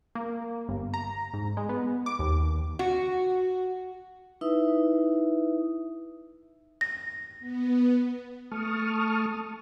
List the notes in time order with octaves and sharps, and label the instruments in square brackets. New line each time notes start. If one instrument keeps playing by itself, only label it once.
[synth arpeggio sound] A#3
G1
A#5
G#2
G#3
B3
D6
D#2
[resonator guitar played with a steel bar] F#4
[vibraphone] D#4 E4 B4 E5 D#6
[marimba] A#6
[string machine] B3
[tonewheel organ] A3 A5 C#6 D#6 F6